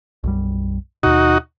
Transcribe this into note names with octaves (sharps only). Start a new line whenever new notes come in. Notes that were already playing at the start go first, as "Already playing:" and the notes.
B1 F#2 G3
D#2 B2 D#4 F#4